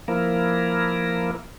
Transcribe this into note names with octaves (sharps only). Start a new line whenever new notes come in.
F3 A#3 E4 A#4